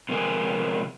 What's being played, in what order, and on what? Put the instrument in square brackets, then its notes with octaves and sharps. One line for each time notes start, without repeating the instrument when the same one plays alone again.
[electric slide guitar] C3 F3 G#3 A#4 G#5